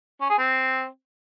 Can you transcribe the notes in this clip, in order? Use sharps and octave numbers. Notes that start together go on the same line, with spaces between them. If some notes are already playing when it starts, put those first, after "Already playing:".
C#4
G#4
C4